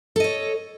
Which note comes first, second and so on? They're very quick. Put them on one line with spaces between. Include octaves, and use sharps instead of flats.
A4 D#5 C#5